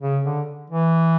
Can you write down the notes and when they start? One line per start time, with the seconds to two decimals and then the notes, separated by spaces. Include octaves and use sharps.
0.01 C#3
0.24 D3
0.70 E3